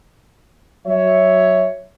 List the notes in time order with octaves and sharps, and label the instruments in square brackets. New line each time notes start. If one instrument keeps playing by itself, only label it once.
[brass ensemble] F#3 C#5 E5